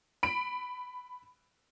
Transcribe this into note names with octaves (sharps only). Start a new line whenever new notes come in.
B5 D7